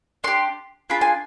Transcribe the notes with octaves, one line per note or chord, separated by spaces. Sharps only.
D4 G4 C6
D4 F4 G#4 B5
G#5